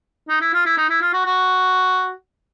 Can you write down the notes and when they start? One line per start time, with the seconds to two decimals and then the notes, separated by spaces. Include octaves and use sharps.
0.29 D#4
0.41 E4
0.53 F4
0.66 E4
0.77 D#4
0.90 E4
1.01 F4
1.13 F#4
1.26 F#4